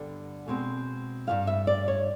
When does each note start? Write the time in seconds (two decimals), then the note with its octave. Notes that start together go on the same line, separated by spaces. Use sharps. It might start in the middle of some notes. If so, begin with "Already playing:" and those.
Already playing: G2 D3 G3 B3
0.48 B2 G#3 C4
1.27 G2 E3 G3 F5
1.47 E5
1.67 D5
1.88 C#5